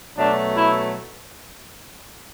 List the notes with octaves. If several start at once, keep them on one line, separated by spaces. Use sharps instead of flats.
B2 F#3 A3 D4
E4